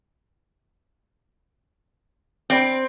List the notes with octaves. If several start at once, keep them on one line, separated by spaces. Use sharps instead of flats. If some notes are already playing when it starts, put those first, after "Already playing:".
C4 D5 G5 B5